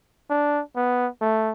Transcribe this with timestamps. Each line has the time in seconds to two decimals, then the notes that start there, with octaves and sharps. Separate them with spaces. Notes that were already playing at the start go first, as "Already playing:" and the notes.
0.30 D4
0.76 B3
1.21 A3